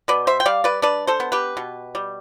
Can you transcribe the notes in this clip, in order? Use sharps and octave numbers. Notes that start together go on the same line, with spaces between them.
B2 B4 D5
C5 E5
G5
G3 D5 F5
B4 D5
D4 B4 D5
A4 C5
B3
G4 B4
B2
G3